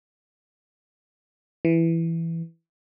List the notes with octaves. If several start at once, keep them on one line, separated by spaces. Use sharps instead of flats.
E3